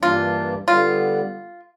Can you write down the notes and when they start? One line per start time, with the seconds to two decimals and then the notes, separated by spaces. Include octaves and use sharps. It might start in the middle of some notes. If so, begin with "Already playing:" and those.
0.02 G2 E3 G3 A#3 D4 F4
0.68 D3 G3 B3 F4